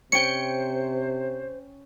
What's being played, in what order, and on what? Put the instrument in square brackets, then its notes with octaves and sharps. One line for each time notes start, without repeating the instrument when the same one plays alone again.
[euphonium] C3 [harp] C#4 G5 [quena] C5 [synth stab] C#7